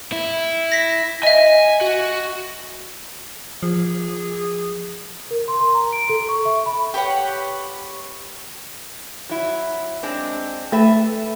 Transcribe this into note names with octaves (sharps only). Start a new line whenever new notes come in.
E4
A#6 B6
D#5 E5 G#5
F#4
F3 G#4
A#4
C6
C6
A#5
D7
A4
C#6
E5
B5
G4 B4 C#5 F#5
F#3 E4
G#3 C4 D4
A3 A4 B4 E5